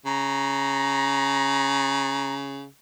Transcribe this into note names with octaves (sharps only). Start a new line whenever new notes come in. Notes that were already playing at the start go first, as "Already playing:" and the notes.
C#3 A#5